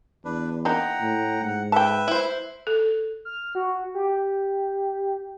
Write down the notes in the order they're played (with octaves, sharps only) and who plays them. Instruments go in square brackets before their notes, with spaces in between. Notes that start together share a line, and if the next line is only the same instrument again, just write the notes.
[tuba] E2 [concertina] D4 B4
[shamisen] A#3 D4 D#4 [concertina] F#5 G5 A#5
[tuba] A2
[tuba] G#2 [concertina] F#5
[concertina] B4 E5 [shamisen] G5 A5
[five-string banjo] E4 C5
[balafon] A4
[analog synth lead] F6
F#4
G4